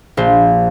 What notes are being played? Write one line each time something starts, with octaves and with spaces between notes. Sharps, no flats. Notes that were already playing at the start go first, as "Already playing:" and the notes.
A#1 C5